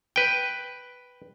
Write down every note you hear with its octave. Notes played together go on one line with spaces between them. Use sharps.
B4 G5